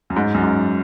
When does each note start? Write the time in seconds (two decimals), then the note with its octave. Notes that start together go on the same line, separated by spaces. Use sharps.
0.10 F#2
0.16 G#2
0.34 F#2
0.44 G#2